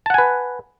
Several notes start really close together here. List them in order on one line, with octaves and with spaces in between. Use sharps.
A5 F#5 G#5 B4